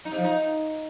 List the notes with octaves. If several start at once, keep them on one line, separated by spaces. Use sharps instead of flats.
D#4
C3
F3
D#4